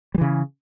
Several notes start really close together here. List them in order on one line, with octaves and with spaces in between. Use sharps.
G3 E3 C#3